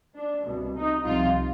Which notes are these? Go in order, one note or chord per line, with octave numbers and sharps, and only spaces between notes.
D4
C2 B2
D#4
C2 C3 F3 F4